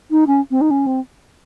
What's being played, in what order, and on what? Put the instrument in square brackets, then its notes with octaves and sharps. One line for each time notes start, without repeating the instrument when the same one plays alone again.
[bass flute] D#4
C#4
C4
D#4
C#4
C4